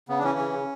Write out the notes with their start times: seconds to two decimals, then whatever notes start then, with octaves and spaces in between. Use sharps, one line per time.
0.09 C#3 B3
0.19 D4
0.23 E3 C#4
0.39 C#3
0.53 C#3